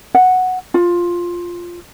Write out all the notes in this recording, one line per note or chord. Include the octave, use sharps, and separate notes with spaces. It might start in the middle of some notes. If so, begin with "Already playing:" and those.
F#5
F4